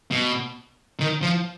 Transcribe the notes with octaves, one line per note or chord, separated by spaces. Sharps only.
B2
D#3
F3